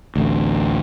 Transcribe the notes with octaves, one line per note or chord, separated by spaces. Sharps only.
A1 D2